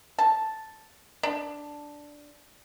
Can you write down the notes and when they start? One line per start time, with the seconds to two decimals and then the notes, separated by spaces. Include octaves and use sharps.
0.19 A5
1.23 D4